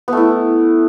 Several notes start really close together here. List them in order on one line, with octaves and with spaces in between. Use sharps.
B3 A3 E4